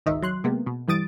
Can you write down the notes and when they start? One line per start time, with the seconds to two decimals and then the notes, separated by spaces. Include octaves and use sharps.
0.06 G#1 C#2 D#3 D#5 E5
0.22 F#3 C6 F#6
0.44 C3 G#3 A#3 B3
0.66 B2
0.88 G2 E3 G3 D#6 A6 D7